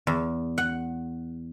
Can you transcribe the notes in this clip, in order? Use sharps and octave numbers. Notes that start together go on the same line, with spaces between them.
E2
F#5